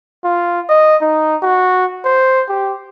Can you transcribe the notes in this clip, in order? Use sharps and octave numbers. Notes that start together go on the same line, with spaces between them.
F4
D#5
D#4
F#4
C5
G4